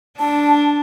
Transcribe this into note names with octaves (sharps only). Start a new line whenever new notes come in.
D4 A5